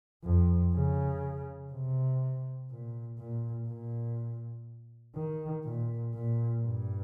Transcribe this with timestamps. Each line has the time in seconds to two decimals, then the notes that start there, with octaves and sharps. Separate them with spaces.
0.24 F2
0.73 C#3
1.72 C3
2.71 A#2
3.19 A#2
3.68 A#2
5.16 D#3
5.64 A#2
6.14 A#2
6.63 G2